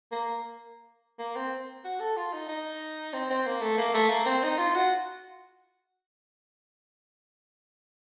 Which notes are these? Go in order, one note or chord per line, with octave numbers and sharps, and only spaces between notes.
A#3
A#3
C4
F#4
A4
F4
D#4
D#4
C4
C4
A#3
A3
A#3
A3
A#3
C4
D#4
F4
F#4